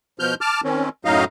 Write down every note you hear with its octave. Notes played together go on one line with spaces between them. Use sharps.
B2 F3 F6 G6
A5 D6 F6
D#3 C4 C#4
F#2 A2 F#3 D#4 D#5 F5